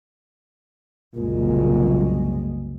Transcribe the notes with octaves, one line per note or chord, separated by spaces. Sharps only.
F#1 C2 A#2 G#3